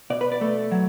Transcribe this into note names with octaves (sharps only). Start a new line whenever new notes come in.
B2 D5
B4
D5
A3
F#3